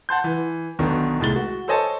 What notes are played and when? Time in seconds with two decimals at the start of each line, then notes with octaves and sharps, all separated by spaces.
0.09 F#5 A5 C6 G6
0.24 E3
0.79 B1 B2 D3 D#3
1.20 C2 A2 G#3 A6 G7
1.36 F#4
1.68 A4 C5 C#5 D#5 G#5 A5